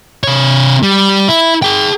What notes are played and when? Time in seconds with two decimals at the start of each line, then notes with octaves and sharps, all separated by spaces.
0.24 C3 C#5
0.83 G3
1.29 E4
1.62 G#4 G5